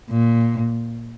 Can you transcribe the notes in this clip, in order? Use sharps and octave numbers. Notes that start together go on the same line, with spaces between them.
A#2